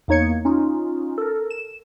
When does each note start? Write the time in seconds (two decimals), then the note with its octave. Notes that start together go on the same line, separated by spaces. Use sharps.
0.08 E2 A#3 D#4 C#5 G#6 C#7
0.45 C#4 D#4 F4
1.18 A4 A#4
1.50 E7